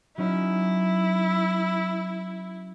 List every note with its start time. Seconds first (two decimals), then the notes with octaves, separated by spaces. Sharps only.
0.18 F#3 C#4 D#4 E4